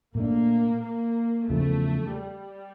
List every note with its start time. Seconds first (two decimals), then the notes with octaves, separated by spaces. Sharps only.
0.15 A#2 A3 A#3 D4
0.82 A#3
1.50 E2 C#3 F3 A3
2.17 G3